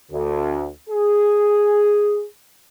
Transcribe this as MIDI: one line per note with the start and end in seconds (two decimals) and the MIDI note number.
0.11 0.69 38
0.90 2.25 68